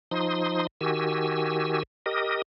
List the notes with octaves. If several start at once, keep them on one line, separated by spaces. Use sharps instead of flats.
F3 D#4 C6 D#6
D#3 F#4 G4 G#5 E6
G4 A#4 D#5 D#6